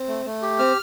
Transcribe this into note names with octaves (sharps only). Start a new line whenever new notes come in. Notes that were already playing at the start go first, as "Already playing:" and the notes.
Already playing: C4
A3
A3
G4
C4 F6